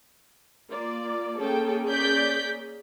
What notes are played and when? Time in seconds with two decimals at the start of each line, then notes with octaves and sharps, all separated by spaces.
0.70 A#3 F4 D5
1.38 A#3 C#4 G#4 A4 G5
1.89 D5 G6 B6